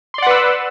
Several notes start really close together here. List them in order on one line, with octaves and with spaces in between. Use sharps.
C6 D5 F#5 B4 E6